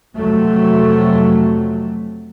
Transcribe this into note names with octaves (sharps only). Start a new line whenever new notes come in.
F2 C3 F#3 A3